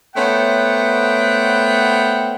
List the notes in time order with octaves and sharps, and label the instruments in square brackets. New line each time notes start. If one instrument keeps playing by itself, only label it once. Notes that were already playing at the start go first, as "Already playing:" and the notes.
[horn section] A3 B3 C5 C#5 F#5 G5